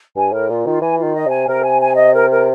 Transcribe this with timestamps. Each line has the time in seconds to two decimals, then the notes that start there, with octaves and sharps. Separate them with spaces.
0.16 G2 G#5
0.32 A2 A#4
0.49 A#2 F4
0.66 D#3 F4
0.82 E3 G#5
0.99 F4
1.04 D#3
1.15 D#5
1.26 C3
1.32 G#5
1.48 C3 A#4
1.64 G#5
1.82 G#5
1.97 D#5
2.13 A#4
2.30 A#4